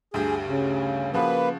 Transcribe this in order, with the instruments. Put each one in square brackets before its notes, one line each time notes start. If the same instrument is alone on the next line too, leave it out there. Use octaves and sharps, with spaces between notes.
[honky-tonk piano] D2 G2 G4 [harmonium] G#4
[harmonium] C#3
[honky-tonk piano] C#3 F3 F#4 [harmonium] A#3 B4